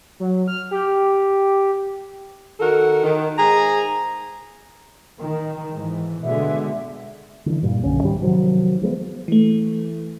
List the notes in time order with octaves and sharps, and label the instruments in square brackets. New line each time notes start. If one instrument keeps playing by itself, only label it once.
[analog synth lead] F#3
F6
G4
[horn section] D#3 F#4 A4 A#4
D#3
G#2 G#4 A#5
[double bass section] D#3
G#2 E3
[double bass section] B2 D3 G#3 [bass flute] E5
[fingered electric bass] D3 E3
G2 A#2 G3
B1 D3 C#4
G#2 D#3 G3
C3 D#3 F3 F#3
F3 G#3 B3
[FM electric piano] E3 A3